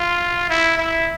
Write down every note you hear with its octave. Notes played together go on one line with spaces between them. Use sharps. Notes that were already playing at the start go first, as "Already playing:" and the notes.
Already playing: F4
E4
E4